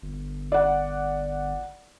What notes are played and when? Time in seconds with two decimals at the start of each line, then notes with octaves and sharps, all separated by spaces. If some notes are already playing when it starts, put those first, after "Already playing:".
0.02 G1
0.52 D5 F#5